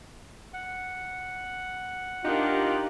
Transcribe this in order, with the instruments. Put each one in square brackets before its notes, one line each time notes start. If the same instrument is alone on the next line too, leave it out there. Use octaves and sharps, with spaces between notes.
[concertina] F#5
[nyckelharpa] D4 A#4 [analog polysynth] D#4 G4 F#6 [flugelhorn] F4